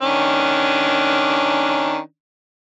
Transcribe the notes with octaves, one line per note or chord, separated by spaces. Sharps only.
D#3 C#4 D4